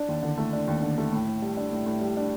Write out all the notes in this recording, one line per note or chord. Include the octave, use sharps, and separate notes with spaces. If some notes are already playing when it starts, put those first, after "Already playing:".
Already playing: D4
D#2
D3
A3
D4
D#2
D3
A3
A2
A2
G3
D4
A2
A2
G3
D4